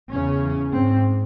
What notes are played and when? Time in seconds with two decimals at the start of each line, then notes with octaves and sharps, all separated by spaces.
0.10 E2 C#3 C#4
0.72 G#2 C4